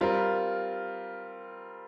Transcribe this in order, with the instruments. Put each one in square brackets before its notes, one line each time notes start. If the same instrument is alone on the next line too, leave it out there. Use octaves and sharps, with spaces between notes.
[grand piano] G3 C4 F4 A#4